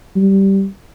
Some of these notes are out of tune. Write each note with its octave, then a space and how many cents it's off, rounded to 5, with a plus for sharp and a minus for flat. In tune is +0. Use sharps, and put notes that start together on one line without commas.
G3 -10